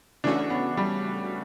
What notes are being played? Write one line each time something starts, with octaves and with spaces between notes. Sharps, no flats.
C#3 E3 A3 C#4 D4 F#4
B3
G3